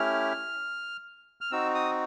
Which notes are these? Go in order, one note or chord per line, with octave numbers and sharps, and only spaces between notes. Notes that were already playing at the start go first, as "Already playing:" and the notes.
Already playing: A3 C#4 E4 G4 F6
F6
C4 D#4 F#4 E6
D#6